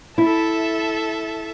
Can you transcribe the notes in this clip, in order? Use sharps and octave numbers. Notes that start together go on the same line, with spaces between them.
E4 A4 E5 A5